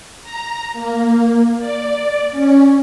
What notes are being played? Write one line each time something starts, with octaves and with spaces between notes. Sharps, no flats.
A#5
A#3
D5
C#4